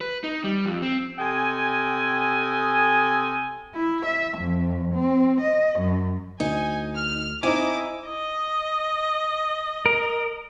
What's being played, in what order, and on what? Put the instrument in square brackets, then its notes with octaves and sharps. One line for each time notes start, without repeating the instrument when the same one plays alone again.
[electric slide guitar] B4
D#4
G3
F2
C4
[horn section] C3 A4 D#5 G5 G#5
[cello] E4
E5
F2
C4
D#5
F#2
[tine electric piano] D2 [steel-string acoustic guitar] D#4 [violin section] G#5
[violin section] F6
[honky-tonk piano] C4 D#4 [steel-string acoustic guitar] E4 [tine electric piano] G#5 [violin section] D6
[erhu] D#5
[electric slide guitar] A#4